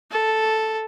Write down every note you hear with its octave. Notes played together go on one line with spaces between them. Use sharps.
A4